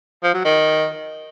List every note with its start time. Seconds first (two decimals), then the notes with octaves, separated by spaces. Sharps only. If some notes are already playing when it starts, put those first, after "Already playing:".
0.24 F3
0.34 F#3
0.45 D#3